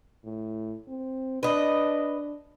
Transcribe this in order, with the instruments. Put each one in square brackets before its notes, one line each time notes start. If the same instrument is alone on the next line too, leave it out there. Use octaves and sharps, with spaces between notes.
[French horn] A2
C4
[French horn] D4 [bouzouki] B4 D#5